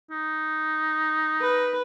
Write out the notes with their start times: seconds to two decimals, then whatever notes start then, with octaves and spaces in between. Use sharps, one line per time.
0.11 D#4
1.41 B4